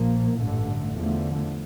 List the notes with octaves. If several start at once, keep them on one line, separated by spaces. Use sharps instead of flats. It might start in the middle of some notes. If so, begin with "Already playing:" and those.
Already playing: A#1 A#2 F3 A#3
A1 G2 D3 A3
E2 D3 F3 A3